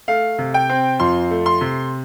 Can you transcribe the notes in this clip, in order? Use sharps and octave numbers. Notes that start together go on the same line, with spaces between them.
A3 F5
C3
G5
C4
F2 C6
A3
C6
C3